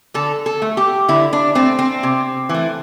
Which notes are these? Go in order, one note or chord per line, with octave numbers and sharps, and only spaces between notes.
D3 A4
A4
A3
G4
D3 E4
D4
A3 C4
C4
C3
E3
A3